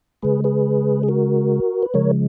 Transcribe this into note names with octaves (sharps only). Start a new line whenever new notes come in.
C#3 G#3 G#4 B4
G#4 B4
G#4
F#4 A#4
B4
C#3 F3 G#3 A#4 C#5